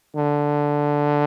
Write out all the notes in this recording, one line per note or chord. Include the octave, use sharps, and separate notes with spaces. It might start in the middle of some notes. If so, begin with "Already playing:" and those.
D3